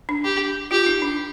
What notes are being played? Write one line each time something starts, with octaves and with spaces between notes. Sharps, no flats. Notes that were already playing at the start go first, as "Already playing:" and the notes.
D4
G4
F4 G4
D#4
D4